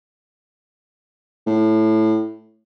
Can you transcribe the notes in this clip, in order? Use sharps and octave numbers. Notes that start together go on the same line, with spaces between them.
A2